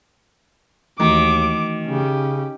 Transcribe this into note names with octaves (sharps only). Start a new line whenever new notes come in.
D#2 D#3 E3 A3 F#4 D6
C#3 C#4 G4